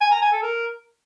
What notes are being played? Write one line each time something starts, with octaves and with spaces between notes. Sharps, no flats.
G#5
A#5
G#5
A4
A#4